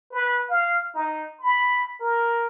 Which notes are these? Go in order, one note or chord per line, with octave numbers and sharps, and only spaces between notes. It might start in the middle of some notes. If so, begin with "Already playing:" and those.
B4
F5
D#4
B5
A#4